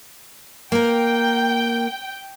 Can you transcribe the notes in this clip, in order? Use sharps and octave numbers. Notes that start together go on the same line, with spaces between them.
A#3 A#4 G5